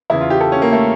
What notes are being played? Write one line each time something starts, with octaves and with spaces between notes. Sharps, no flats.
E2 C#3 E3 E4
F4
G4
A4
C#4
A#3
A3